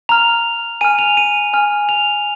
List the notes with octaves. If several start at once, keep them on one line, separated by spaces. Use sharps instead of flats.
A#5 F6 F7
G#5 F6 D#7
F7
D#7
G#5 F6
F7